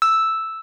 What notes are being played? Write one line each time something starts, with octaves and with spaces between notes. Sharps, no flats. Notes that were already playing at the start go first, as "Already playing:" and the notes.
E6